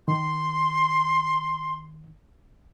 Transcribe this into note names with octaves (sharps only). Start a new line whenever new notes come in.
D#3 C6